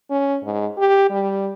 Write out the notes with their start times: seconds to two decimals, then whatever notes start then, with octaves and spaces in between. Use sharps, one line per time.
0.10 C#4
0.44 G#2
0.78 G4
1.10 G3